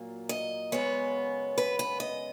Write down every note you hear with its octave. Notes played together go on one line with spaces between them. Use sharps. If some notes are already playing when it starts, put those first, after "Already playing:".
Already playing: A#2 F#3 A#3
D#5
F#2 C#3 G#3 B3 C#5
B4
B4
D#5